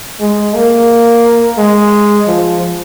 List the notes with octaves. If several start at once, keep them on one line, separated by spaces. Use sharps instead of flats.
G#3
A#3
G#3
F3